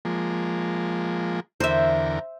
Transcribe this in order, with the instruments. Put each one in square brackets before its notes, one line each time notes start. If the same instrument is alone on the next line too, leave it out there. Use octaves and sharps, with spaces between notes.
[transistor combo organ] F3 G#3 A#3
[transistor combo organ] E2 D3 A#4 [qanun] C5 E5